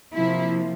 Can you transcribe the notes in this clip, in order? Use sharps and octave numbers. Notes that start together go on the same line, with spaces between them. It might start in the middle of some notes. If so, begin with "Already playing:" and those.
C3 F3 A#3 E4